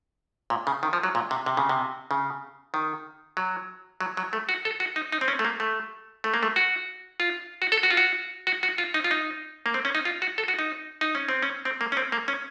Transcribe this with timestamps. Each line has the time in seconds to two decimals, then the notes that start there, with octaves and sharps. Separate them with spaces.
0.50 A#2
0.67 C#3
0.83 D#3
0.93 F3
1.03 F#3
1.15 A#2
1.31 C3
1.46 C3
1.57 C#3
1.69 C3
2.11 C#3
2.74 D#3
3.37 F#3
4.01 F#3
4.17 F#3
4.33 A3
4.49 F#4
4.65 A4
4.80 F#4
4.96 D#4
5.12 D#4
5.21 C4
5.28 C#4
5.39 A3
5.45 A#3
5.60 A3
6.24 A3
6.34 A#3
6.43 A3
6.56 F#4
7.20 F4
7.62 F#4
7.72 A4
7.83 F#4
7.91 F4
7.97 F#4
8.47 F#4
8.63 F#4
8.78 F4
8.94 D#4
9.04 F4
9.11 D#4
9.66 A#3
9.74 C4
9.85 C#4
9.95 D#4
10.05 F4
10.22 F#4
10.38 A4
10.48 F#4
10.59 D#4
11.01 D#4
11.15 C#4
11.29 C4
11.42 C#4
11.65 C4
11.81 A#3
11.92 C#4
11.97 C4
12.12 A#3
12.28 C#4